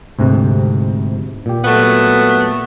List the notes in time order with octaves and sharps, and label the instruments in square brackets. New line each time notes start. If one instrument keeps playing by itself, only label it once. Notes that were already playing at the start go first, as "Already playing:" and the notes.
[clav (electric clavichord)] D2 G#2 C3
A#2 G4
[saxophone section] F#3 A3 B3